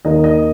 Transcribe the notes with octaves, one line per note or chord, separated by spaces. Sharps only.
D#2 D#3 A#3 D#5
D#5